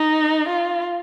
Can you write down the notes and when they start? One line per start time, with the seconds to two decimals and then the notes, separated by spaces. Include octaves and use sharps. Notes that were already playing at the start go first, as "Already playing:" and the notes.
Already playing: D#4
0.49 F4